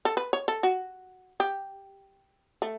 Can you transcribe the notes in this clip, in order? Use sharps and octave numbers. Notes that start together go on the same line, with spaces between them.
A4
B4
C#5
A4
F#4
G4
A3